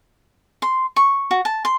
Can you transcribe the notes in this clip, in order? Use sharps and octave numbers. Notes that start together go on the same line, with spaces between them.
C6
C#6
F#4
A5
C6